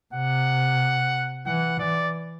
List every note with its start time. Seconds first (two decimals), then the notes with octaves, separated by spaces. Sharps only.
0.14 C3 F#5
1.46 E3 F#5
1.79 E3 D5